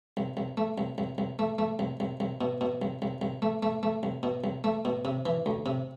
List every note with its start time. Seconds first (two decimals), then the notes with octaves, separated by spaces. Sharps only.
0.17 C2
0.37 C2
0.57 A3
0.78 C2
0.98 C2
1.18 C2
1.39 A3
1.59 A3
1.79 C2
2.00 C2
2.20 C2
2.41 B2
2.61 B2
2.82 C2
3.02 C2
3.22 C2
3.42 A3
3.63 A3
3.83 A3
4.03 C2
4.23 B2
4.44 C2
4.64 A3
4.85 B2
5.05 C3
5.26 E3
5.46 D2
5.66 C3